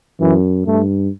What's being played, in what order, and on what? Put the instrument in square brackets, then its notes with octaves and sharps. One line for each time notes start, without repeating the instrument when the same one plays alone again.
[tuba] F#2 [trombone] E3
[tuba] G2 [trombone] A3